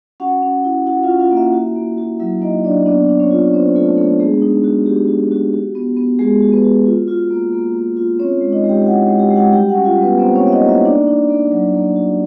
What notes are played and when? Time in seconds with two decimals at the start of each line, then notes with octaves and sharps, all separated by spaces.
0.20 C#4 F#4 F#5
0.42 C#4
0.64 E4
0.87 E4 F#4 F#5
1.03 F4 F5
1.09 C#4
1.20 F4 F5
1.31 A#3
1.36 E4 E5
1.53 F#4
1.76 A#3
1.98 F#4
2.19 F#3 E4 E5
2.42 A#3 D#4 D#5
2.64 F#3 D4 D5
2.86 B3 D4 D5
3.09 D4
3.19 C#4 C#5
3.31 F4
3.53 C4 D4 C5
3.76 A3 F4 A4
3.97 A3 D4 A4
4.20 G#3 B3 G#4
4.42 D#4
4.64 F#4
4.86 F#4 G4
5.08 F#4
5.31 F#4
5.53 F#4
5.75 B3
5.97 B3
6.19 G#3 F#4 G#4
6.42 F#4
6.52 B3 B4
6.64 F#4
6.86 F4
7.08 F4
7.30 A#3
7.53 A#3
7.75 A#3
7.97 F4
8.19 C4 C#4 C#5
8.41 G#3
8.52 D#4 D#5
8.64 G#3
8.69 G4 G5
8.86 E4 F#4 F#5
9.07 G#3
9.19 G4 G5
9.30 G#3
9.36 F#4 F#5
9.52 G3 G4 G5
9.69 F#4 F#5
9.75 C#4
9.85 F4 F5
9.97 G3
10.02 B3 B4
10.18 A#3 C4 C5
10.35 C#4 C#5
10.41 A#3
10.48 E5
10.52 D#4 D#5
10.63 A#3
10.69 E4 E5
10.85 D4 D#4 D5
11.07 D#4
11.30 A#3
11.52 F#3
11.74 A#3
11.96 F#4